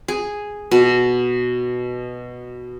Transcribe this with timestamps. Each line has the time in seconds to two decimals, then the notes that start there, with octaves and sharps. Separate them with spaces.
0.08 G#4
0.71 B2